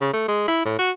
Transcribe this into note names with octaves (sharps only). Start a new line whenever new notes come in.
C#3
A3
G#3
E4
A2
F#4